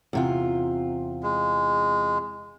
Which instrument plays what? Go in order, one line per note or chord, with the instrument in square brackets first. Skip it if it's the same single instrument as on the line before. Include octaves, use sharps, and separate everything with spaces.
[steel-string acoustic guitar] E2 C3 F4
[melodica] G#3